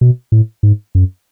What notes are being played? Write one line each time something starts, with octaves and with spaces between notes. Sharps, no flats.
B2
A2
G#2
F#2